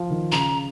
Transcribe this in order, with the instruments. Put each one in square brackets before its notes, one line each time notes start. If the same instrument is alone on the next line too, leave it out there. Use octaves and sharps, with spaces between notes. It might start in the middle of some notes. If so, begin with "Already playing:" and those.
Already playing: [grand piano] F3
D#3
[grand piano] C#3 [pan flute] A#5